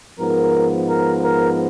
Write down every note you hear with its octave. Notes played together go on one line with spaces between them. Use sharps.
G#2 F3 B3 A#4
A#4
A#4